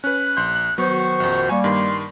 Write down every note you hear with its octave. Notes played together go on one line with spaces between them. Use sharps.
C#4 B4 F#6
A#1 C6 G6
D#3 F#3 B3 F#4 C5 C#6
A#1 F2
G3 A#3 G#5 C#6
G2 D#3 C6